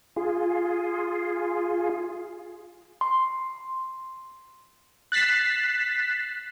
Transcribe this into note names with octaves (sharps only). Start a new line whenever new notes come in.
F4 G#4
C6
F#6 A6 B6 C7 E7